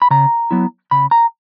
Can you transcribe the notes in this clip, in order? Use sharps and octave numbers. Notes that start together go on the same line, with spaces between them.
B5
C#3 A#5
F#3 B3 E4
C#3 B5
A#5